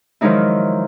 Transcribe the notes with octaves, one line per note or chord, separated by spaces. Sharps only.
D#3 F3 F#3 G#3 D#4 E4